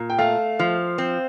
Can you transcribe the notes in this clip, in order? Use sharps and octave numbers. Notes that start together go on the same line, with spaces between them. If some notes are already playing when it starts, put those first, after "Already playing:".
Already playing: A#2
G5
A3 F5
F3
C4